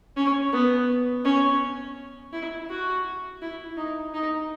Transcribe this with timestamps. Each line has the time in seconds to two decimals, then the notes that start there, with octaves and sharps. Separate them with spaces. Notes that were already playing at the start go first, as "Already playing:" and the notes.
0.16 C#4
0.53 B3
1.25 C#4
2.33 E4
2.70 F#4
3.42 E4
3.77 D#4
4.14 D#4